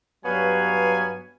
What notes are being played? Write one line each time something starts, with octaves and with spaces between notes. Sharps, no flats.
G2 F#3 B3 C#5 F5 G#5